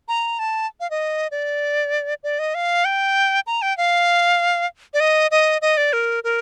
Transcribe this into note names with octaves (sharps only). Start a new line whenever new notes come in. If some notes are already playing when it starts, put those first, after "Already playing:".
A#5
A5
F5
D#5
D5
D5
D#5
F5
G5
A#5
G5
F5
D5
D#5
D#5
D#5
D5
A#4
A#4